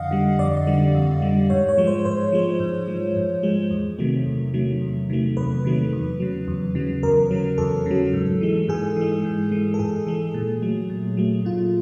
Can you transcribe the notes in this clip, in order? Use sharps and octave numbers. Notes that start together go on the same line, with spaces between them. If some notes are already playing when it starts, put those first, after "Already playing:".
Already playing: F2 D3 D#5 F5 F#5
D3 G3
F2 D5
D3 G3
F2
D3 G3
G#2 C#5
C#5
F3 G#3
C5
G#2 C5
F3 G#3
G#2
F3 G#3
G#2
F3 G#3
E2
C3 D#3 F#3 A3
E2
C3 D#3 F#3 A3
E2
C3 D#3 F#3 A3
E2 B4
C3 D#3 F#3 A3
E2
C#3 F#3
E2
C#3 F#3
E2 A#4
C#3 F#3
E2 A4
C#3 F#3
G#2
E3 G#3
G#2 G#4
E3 G#3
G#2
E3 G#3
A4
G#2 G#4
E3 G#3
A#2
F#3 A3
A#2
F#3 A3
A#2 F4